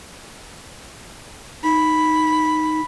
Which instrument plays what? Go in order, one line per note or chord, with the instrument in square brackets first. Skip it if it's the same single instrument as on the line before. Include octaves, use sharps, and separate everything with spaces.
[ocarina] D#4 [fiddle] B5